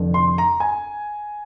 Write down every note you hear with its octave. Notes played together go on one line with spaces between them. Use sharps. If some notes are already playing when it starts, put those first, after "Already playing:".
Already playing: F1 F2 D3
C6
A#5
G#5